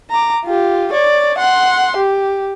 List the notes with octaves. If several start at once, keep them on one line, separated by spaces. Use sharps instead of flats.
A#5 D6
F4 G4
C#5 D5
F#5 C6
G4